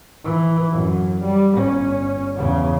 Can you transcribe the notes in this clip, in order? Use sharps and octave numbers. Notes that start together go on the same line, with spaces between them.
E3
F#2
G3
G1 C#4
E2 C#3